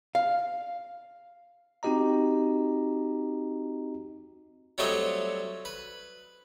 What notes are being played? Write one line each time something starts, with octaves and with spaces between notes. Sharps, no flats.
F5
C4 D#4 F#4 G4 D#5 A#5
F#3 G3 A3 C4 C#5 D#5
B4